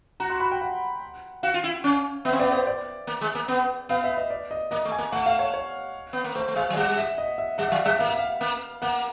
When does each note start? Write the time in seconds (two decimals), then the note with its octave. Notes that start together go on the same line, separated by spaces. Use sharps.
0.20 F#4 A#5
0.30 C6
0.40 B5
0.52 G5
0.61 F#5
1.43 F#4 F5
1.54 F4
1.64 E4
1.84 C#4
2.25 B3 E5
2.33 C4
2.39 B3 D5
2.53 C5
2.67 D5
3.07 A#3
3.21 G#3
3.35 A#3
3.48 B3
3.89 B3 F5
4.04 E5
4.18 D#5
4.30 D5
4.51 D#5
4.71 A#3 D#5
4.85 A3
4.92 G#5
4.98 A#3
5.12 A3 F#5
5.26 F5
5.39 C#5
5.54 C#5
6.13 B3
6.24 A#3
6.35 A3 C5
6.48 A3
6.55 G#3 F5
6.70 F#3
6.76 G3 F#5
6.97 E5
7.18 D#5
7.38 E5
7.58 G3 F#5
7.68 E5
7.72 F#3 F5
7.85 G3 E5
7.99 A#3 F5
8.08 E5
8.19 F5
8.41 A#3
8.82 A#3 F#5